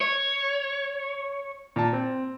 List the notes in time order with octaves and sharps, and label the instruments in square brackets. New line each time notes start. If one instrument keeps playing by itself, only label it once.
[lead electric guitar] C#5
[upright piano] A#2 A5
C4